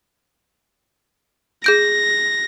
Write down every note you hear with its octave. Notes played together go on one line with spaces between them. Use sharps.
G#4 G6 A#6 D7